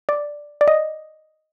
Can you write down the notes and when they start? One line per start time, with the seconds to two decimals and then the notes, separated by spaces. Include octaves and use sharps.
0.09 D5
0.61 D5
0.68 D#5